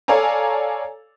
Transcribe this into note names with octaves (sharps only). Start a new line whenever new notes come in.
A4 C#5 D5 F5 G#5 A#5